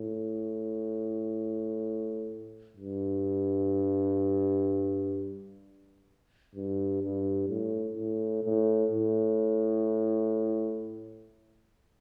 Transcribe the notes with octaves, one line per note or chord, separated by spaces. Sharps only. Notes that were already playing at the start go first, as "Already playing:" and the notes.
Already playing: A2
G2
G2
G2
A2
A2
A2
A2